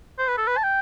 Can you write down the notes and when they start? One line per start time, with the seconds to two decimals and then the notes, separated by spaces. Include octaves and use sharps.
0.18 C5
0.28 B4
0.37 A4
0.47 B4
0.57 A5
0.63 G5